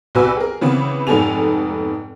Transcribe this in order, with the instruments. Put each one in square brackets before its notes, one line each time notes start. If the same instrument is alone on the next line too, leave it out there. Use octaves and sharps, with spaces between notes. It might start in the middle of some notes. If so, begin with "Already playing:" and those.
[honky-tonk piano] C2 B3 F#4 B4 G#5 E6
G#4 A#4
C#3 E3 B3 C4
F1 G#2 B3 A4 G#5 F7